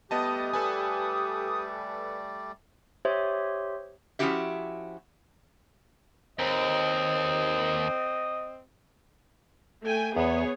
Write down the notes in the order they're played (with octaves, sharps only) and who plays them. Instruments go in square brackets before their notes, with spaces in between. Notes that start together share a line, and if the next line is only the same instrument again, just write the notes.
[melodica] G3 A3 D5 [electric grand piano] B3 D#5 A5 [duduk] G4 [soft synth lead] D#6
[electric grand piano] A4 B4 G#5
[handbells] G4 C5 C#5 E5 C6 D#6
[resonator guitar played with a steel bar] F3 C#4 E4 F#4 G4 E5
[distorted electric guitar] D#2 [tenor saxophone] C4 [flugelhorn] D#5
[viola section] A3 G5 G#5
[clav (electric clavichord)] E2 [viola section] B3 G#4 C#5